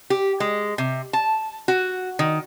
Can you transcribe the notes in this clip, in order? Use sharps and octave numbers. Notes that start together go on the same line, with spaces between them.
G4
G#3
C3
A5
F#4
D#3